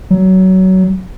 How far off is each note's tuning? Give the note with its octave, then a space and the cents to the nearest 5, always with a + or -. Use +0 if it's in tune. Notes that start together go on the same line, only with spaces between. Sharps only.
F#3 +20